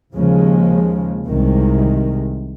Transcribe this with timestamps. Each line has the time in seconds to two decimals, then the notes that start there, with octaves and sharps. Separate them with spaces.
0.14 D#2 C#3 F3 G#3
1.26 C2 C3 D#3 G#3